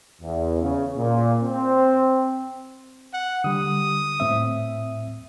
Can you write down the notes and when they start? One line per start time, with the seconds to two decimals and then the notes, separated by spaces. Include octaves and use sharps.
0.21 E2
0.61 C#3
0.98 A#2
1.44 C4
3.13 F#5
3.44 D3 G3 D#6
4.20 A2 C4 E5